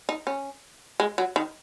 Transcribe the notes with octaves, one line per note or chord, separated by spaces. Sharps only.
D#4
C#4
G#3
F#3
D#3